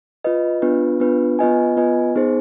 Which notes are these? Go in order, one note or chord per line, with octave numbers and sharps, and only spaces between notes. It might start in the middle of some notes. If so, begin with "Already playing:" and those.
F4 B4 D#5
B3 D4 F4 B4
B3 D4 F4 B4
B3 F4 B4 D#5 G#5
B3 F4 B4 D#5 G#5
B3 D#4 G#4 C5